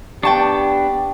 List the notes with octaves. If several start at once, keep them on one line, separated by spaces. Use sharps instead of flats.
B3 D4 G4 G5 A5 C#6